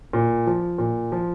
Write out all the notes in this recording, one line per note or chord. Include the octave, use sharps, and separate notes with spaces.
A#2
F3
A#2
F3